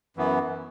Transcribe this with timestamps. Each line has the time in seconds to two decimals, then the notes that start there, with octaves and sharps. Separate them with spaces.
0.17 F#2 E3 B3